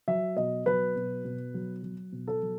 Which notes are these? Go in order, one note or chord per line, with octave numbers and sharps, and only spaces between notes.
F#3 E5
B2 D#5
F#3 B4
B2
B2
F#3
F#3
B2
A4
F#3